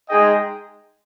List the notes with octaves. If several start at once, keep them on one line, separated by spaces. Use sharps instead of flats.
G#3 D#4 G#4 D#5 G5